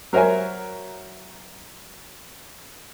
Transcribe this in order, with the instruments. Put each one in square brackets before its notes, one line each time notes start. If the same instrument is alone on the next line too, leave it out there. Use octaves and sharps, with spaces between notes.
[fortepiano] F#3 A#4 C5 E5 G#5